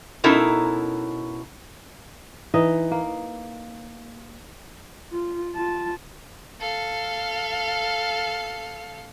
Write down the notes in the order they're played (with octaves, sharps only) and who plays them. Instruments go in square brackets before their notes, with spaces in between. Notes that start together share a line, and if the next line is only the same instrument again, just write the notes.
[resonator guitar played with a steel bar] B2 C#4 D#4 E4 A4 A#4
[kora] E3 D#4 D#5
A#3
[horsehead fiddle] F4
F4 A5
[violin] A4 F5